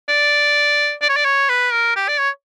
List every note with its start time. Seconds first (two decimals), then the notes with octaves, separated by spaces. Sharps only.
0.09 D5
1.02 D5
1.09 C#5
1.16 D5
1.25 C#5
1.49 B4
1.73 A#4
1.96 G4
2.08 D5
2.19 C#5